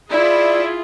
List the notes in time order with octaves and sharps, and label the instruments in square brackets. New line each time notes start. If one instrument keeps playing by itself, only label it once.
[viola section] E4 [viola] F4 G#4 [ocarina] D5